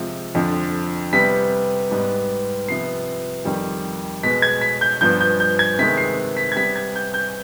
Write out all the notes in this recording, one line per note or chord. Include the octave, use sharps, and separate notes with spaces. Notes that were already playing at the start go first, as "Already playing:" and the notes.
Already playing: C3 F3 G#3
F2 D3 F3
C3 G3 B3 B6
G#2 G3 B3
C3 F3 B3 C7
F2 D#3 G3
B2 G#3 B3 B6
G#6
B6
G6
G2 F3 B3 G6
G6
G6
G#6
C3 D#3 G#3 B3 B6
C7
B6
G#6
C3 G3 B3 B6
G#6
G6
G6